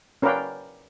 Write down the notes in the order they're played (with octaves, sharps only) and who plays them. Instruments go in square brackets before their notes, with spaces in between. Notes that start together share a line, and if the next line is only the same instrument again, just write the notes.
[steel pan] C#4 A#4 B4 D5 F5 G5